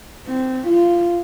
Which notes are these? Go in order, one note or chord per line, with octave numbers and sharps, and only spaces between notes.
C4
F4